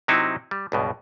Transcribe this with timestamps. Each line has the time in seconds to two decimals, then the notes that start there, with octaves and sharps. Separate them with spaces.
0.08 C3 F#3 C4 D#4 E4 F#4
0.51 G3
0.72 C#2 G2 B2